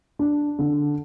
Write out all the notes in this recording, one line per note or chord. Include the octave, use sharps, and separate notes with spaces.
D4
D3